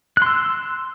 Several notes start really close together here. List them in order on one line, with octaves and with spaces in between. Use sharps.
F#6 C6 E6